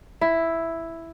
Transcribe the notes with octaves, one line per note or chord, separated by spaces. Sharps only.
E4